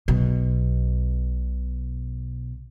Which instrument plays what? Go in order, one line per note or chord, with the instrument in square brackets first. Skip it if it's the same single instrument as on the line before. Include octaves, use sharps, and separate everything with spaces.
[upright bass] B1 B2